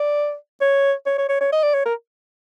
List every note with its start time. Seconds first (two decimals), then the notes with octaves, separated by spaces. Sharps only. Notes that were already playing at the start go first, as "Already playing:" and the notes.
Already playing: D5
0.61 C#5
1.06 C#5
1.18 C#5
1.29 C#5
1.41 C#5
1.52 D#5
1.63 D5
1.74 C#5
1.86 A#4